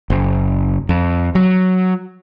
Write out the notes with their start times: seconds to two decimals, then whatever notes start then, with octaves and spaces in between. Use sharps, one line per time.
0.10 F#1
0.89 F2
1.35 F#3